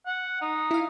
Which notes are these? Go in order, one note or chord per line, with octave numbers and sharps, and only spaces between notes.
F#5
D#4
E4 F5